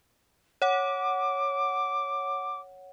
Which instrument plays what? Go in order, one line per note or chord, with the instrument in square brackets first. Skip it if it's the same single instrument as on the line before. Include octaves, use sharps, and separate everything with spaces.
[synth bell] C#5 F#5 [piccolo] D6